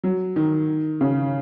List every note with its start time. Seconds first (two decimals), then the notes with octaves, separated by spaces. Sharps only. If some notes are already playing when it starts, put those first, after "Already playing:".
0.04 F#3
0.36 D#3
1.01 C#3